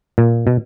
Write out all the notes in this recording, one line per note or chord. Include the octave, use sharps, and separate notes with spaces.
A#2
B2